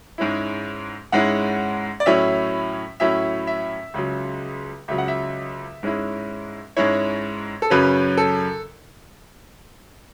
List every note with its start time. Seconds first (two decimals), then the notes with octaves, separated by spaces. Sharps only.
0.18 G#2 G#3 C#4 E4
1.12 G#2 G#3 C#4 E4 F#5
2.00 D5
2.06 A2 F#3 C#4 E4 E5
3.00 A2 F#3 C#4 E4 E5
3.47 E5
3.94 C#2 C#3 F#3
4.88 C#2 C#3 F#3 E5
4.98 F#5
5.08 E5
5.83 G#2 G#3 C#4 E4
6.77 G#2 G#3 C#4 E4 C#5
7.62 A4
7.70 F#2 C#3 F#3 C#4 B4
8.17 A4